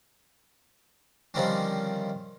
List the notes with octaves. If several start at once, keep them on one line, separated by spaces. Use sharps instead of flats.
D3 D#3 F3 G3 C4 C#4